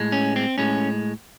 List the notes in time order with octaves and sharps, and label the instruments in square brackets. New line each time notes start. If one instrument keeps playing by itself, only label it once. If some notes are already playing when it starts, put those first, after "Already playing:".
Already playing: [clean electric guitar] A2 G#3
C#4
C4
A2 G#3 C#4